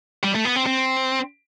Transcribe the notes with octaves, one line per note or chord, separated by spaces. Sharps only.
G3
A3
B3
C4
C4